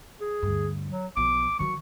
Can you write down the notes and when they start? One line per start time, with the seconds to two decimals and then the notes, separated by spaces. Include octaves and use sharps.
0.21 G#4
0.42 D2 G2
0.90 F#3
1.17 B1 F3 D6
1.59 D#3 F#3 C#6